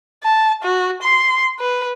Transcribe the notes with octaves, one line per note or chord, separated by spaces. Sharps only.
A5
F#4
C6
B4